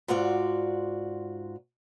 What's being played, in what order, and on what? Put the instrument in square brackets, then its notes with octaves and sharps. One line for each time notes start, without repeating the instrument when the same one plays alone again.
[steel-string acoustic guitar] G#2 F4 F#4 D5